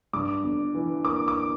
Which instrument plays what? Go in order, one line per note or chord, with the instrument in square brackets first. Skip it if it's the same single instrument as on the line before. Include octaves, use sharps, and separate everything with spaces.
[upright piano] G2 [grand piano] D6
[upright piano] G1
E3
[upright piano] A#3 [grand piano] D6
[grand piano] D6